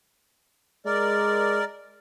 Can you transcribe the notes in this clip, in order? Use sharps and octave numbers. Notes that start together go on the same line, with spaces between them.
G#3 A#4 D5